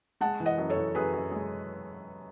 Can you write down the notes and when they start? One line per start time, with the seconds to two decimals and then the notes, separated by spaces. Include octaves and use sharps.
0.21 G#3 F#5 A5
0.40 E3
0.45 D#5 F#5
0.58 F#2
0.70 A4 C#5
0.77 E3
0.95 F#2 G#4 B4
1.13 F#2
1.31 G#3